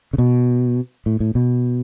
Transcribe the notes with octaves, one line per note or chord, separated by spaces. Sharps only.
C#3
B2
A2
A2
B2